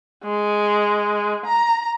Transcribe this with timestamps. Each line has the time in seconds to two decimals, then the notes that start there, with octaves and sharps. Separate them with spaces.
0.24 G#3
1.45 A#5